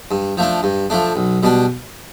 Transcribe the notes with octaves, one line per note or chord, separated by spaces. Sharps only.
G2
F3 A3 D4
G2
F3 A3 D4
B1
B2 G3 D4